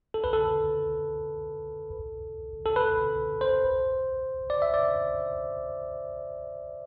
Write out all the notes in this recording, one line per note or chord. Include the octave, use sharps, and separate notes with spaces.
A4
B4
A4
A4
B4
C5
D5
E5
D5